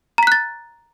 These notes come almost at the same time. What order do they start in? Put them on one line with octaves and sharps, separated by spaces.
A#5 B6 F#6 A6